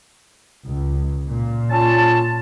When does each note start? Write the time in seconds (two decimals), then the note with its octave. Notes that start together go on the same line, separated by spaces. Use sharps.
0.67 C#2
1.26 A#2
1.70 C#4 F4 A5